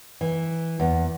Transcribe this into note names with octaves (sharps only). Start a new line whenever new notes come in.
E3
E2